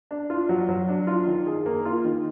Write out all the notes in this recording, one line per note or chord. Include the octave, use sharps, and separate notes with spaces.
D4
F4
F#3
F#3
D4
F4
D#3
G#4
A#3
F4
D#3